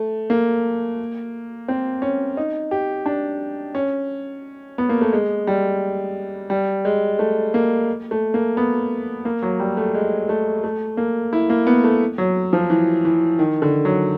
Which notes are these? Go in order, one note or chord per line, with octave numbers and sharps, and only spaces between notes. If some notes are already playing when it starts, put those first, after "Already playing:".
Already playing: A3
A#3
C4
C#4
D#4
G4
D4
C#4
B3
A#3
A3
G#3
G3
G3
G#3
A3
A#3
A3
A#3
B3
A#3
F#3
G3
A3
G#3
A3
A3
A#3
E4
A#3
B3
A3
F#3
F3
E3
E3
D#3
D3
F#3